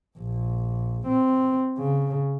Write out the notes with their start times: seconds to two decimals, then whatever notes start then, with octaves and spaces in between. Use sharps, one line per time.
0.19 A#1
1.07 C4
1.78 C#3